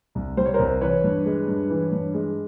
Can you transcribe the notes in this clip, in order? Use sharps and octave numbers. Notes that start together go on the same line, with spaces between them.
C2
G3 C5
C#5
A#4 C5
C2
E3 B4 C#5
G2
G#3
G2
E3
G2
G#3